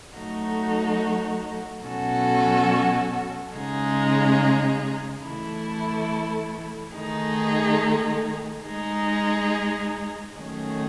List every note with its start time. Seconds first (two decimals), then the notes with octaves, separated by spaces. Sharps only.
0.16 F#3 A3 D#4 F#4
1.86 B2 F#3 C#4 F#4 A4
3.56 C#3 G#3 D#4 G#4
5.26 E3 A3 E4 A4
6.96 D#3 A3 D#4 G#4
8.67 G#3 D#4 G#4
10.36 D#3 F#3 A3 C#4 G#4